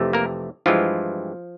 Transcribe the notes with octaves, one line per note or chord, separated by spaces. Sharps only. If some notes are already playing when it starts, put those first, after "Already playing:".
Already playing: F2 C3 E3 A3
A#3 A#4
G2 E3 F3 G#3 F4